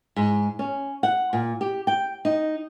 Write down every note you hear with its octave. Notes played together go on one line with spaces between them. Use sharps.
G#2
C#4
F#5
A#2
G4
G5
D#4